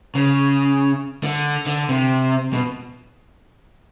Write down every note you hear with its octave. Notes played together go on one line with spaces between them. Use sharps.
C#3
D3
D3
C3
B2